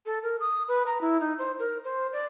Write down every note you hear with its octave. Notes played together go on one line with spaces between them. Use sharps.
A4
A#4
D#6
B4
A#5
E4
D#4
C5
A#4
C5
D5